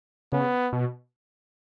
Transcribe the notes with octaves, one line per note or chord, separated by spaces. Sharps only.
C#3 B3
B2